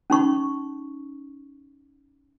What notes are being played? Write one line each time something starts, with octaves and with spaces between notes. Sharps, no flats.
C#4 D#4 C#6